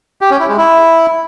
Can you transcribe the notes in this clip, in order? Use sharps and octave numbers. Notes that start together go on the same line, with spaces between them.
G4
C#4
E4
G#3
E4